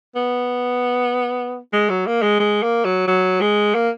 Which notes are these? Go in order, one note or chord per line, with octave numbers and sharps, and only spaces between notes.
B3
G#3
F#3
A#3
G#3
G#3
A#3
F#3
F#3
G#3
A#3